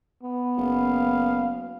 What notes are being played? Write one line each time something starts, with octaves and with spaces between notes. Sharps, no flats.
B3
F#1 F5